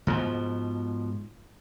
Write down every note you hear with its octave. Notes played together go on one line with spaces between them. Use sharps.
G#2 B2 F3